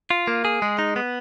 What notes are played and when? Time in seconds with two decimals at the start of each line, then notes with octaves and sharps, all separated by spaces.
0.11 F4
0.28 A#3
0.45 G#4
0.62 G#3
0.79 D#4
0.96 B3